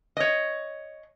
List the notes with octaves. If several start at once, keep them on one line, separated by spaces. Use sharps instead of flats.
C#5 D#5